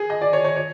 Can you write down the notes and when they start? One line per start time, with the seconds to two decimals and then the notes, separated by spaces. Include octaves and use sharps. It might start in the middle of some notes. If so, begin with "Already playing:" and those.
Already playing: G#4
0.10 D#5
0.22 D5
0.33 C#5
0.45 C#5
0.56 C#5